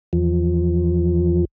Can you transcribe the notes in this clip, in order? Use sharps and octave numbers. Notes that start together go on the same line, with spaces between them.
E2 F3